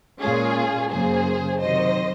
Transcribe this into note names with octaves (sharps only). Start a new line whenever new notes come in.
A#2 G#3 C#4 F4 G#4
F#2 C#3 F#3 A#3 G#4 C5
C3 D#3 F#3 C5 D#5